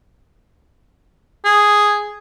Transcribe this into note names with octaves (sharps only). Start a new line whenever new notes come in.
G#4